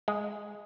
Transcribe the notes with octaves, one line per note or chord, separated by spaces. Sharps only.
G#3